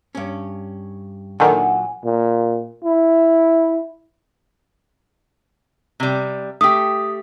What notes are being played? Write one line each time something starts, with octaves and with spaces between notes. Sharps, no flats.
G2 C#4
A#2 D3 D#3 F#3 F#5 G#5
A#2
E4
C3 G3
A3 G4 D#6